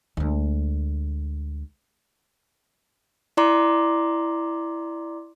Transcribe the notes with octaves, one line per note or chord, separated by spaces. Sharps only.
D2 G#3
E4 D5 A#5 C6 D6